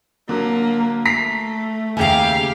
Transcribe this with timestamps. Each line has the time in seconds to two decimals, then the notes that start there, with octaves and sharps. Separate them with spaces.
0.29 D3 F#3 A#3
1.05 A3 A#5 B6 C7
1.97 D#2 C#3 G4 E5 F5 G#5 A#5